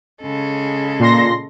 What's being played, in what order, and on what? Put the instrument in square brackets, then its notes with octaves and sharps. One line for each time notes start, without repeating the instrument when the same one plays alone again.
[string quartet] C#3 G#3 A4
[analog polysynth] A#2 C6 A#6